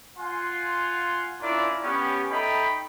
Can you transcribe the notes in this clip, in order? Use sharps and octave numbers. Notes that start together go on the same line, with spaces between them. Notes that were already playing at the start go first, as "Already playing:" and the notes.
F4 F5 F#5 G#5 C6
C#4 D4 E4 F4 A#4 D5
B3 C#4 G4
A3 D#4 G5 B5